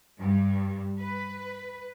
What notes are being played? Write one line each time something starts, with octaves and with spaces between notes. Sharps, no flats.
G2
B4